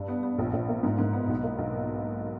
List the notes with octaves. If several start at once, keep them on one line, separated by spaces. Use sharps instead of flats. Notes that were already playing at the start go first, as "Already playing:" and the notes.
Already playing: G2
B3
B3
A#1
A#1
A#3
G#2
G#2
B3
B1
A#3
B1